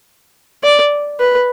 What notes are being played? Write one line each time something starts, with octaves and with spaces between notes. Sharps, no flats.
D5
B4